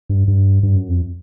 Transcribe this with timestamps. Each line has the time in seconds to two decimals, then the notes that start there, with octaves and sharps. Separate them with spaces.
0.09 G2
0.28 G2
0.63 G2
0.76 F#2
0.89 F2